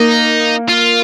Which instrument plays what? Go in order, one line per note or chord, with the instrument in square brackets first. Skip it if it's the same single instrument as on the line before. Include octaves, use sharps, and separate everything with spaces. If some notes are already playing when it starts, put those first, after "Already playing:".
Already playing: [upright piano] A#3 [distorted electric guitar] D#4
[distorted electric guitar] F4